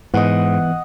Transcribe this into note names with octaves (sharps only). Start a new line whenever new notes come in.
G#2 E3 B3 D#5 F#5